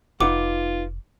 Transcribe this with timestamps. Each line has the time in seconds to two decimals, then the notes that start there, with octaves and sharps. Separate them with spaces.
0.21 F1 D#4 F4 B4 F#5 D6